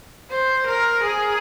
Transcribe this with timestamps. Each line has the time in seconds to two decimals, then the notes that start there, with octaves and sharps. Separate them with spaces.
0.30 C5
0.67 A#4
1.03 G#4